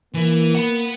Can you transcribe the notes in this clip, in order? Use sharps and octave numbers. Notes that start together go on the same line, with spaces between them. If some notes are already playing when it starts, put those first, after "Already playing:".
E3 A#3 E4
F#5 B5